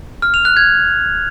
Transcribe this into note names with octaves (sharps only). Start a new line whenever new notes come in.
F6
F7
F#6
G#6